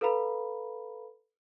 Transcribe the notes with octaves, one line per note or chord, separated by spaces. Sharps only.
A4 B4 F5 A#5 B5